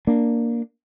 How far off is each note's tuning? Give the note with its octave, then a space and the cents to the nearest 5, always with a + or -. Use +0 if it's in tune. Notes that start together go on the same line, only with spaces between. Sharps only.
A#3 +0 D4 +0